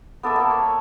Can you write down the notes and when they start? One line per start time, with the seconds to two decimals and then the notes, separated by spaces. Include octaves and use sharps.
0.23 B3 A4 D5 E5
0.36 A#3 A4
0.51 C#5